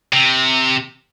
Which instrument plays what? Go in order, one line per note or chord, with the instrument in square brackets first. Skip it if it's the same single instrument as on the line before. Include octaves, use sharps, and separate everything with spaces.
[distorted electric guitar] C3